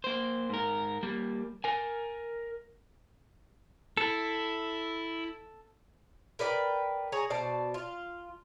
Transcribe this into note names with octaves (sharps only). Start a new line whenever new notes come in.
A#3 C5
G#2 A#4
G3 A#3
A#4 G#5
E4 A4
A#4 B4 D5 G5
G#4 C#5 A#5
B2 C5 D5 A5
F4